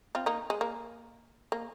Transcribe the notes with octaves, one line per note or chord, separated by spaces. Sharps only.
C4 F4
A#3 D#4
G#3
A#3
A#3